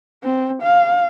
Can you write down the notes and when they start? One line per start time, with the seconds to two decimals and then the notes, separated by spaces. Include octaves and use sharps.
0.24 C4
0.62 F5